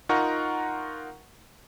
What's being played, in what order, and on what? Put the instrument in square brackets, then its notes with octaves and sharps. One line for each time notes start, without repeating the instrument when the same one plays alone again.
[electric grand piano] D#4 F4 A#4 F#5 A#5 C#6